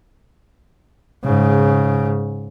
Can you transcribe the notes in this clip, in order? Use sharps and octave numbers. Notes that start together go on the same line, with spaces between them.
G#2 C#3